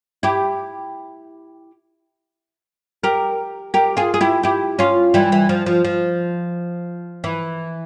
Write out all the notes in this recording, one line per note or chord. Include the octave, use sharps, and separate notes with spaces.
E4 G4
G4 A#4
G4 A#4
F4 G#4
G#4
E4 G4
E4 G4
C#4 F4
E3 G3
E3
F3
F3
F3
E3